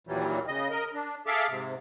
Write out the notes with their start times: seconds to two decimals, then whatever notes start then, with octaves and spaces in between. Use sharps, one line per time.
0.07 D#2 A#2 E3 F#3 G3
0.47 C#3 D#5
0.70 A#4 D#5
0.93 D4
1.26 G#4 A4 E5 F5 D6
1.49 G#2 C3